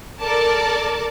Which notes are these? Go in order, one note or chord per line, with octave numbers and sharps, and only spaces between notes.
A4 A#4 D5 A5 D6